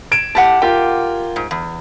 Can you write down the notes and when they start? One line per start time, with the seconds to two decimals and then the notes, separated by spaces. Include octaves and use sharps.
0.12 G#6 D7 E7
0.35 A2 G4 F#5 A5
0.62 F4 G4 A#4 G5
1.36 G#2
1.51 E2